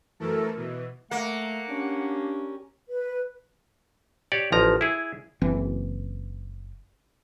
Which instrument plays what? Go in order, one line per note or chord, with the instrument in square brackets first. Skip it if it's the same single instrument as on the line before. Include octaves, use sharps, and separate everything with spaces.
[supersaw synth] F#2 E3 A3 A4 A#4
B2 E3
[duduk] A3 [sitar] A#3 [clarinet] F#5
[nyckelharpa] C#4 G4 [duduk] D4
[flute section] B4
[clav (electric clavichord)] G4 C#5 D5
A1 F3 A#5
E4 G#4
[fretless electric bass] F#1 E3 C4